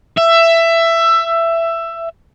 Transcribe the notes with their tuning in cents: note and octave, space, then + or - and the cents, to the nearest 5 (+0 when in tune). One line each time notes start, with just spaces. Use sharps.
E5 +15